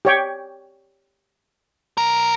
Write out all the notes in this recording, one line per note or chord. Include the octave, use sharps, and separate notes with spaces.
G4 C#5 G5
B1 A#4